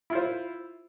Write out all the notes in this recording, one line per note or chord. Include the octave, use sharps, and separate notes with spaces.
E4 F4 C5